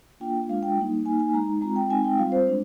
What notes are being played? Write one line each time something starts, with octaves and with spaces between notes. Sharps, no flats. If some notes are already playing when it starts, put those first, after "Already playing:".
A#3 D4 F4 G5
G#3 D4 F4 F5
G5
G3 A#3 D#4
A#3 D#4 G#5
G#5
G#3 D#4 A#5
G#3 C4 F4 A#5
G5
G#3 C4 D#4 G#5
G5
G3 C4 F4 F5
C5
G#3 D4